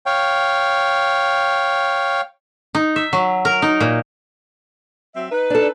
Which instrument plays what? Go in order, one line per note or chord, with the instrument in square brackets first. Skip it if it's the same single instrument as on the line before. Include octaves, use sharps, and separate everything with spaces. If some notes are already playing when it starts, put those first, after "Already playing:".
[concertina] C#5 F5 G5
[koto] D#4
E5
F#3
A#4
D#4
A#2
[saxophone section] F#3 C4 E5
D#4 B4
[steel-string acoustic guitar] D4 A4